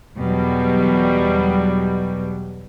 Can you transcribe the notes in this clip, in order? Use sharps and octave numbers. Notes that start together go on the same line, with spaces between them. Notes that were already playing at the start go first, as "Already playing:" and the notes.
E2 B2 F#3 G3